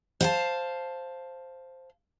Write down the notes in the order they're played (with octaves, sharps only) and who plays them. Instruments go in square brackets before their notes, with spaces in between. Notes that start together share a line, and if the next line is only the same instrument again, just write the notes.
[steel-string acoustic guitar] C5 F5 A5